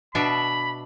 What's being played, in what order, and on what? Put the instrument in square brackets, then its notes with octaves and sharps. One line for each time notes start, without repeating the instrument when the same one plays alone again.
[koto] B2 D4 E5 [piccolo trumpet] B5